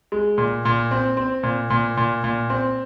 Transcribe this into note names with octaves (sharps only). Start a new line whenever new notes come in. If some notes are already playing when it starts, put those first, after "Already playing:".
G#3
A#2
A#2
C4
C4
A#2
A#2
A#2
A#2
C4